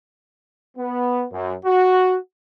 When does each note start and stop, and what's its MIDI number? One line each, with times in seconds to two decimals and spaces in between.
0.77 1.25 59
1.32 1.54 42
1.65 2.16 66